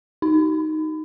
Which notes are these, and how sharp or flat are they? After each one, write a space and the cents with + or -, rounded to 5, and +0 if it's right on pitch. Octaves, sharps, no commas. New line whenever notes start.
D#4 +5